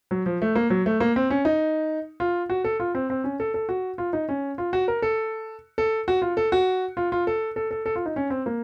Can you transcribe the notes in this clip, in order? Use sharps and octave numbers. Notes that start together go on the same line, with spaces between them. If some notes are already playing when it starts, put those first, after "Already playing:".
F#3
F3
A3
A#3
F#3
A3
A#3
C4
C#4
D#4
F4
F#4
A4
F4
C4
C4
C#4
A4
A4
F#4
F4
D#4
C#4
F4
F#4
A#4
A4
A4
F#4
F4
A4
F#4
F4
F4
A4
A4
A4
A4
F4
D#4
C#4
C4
A#3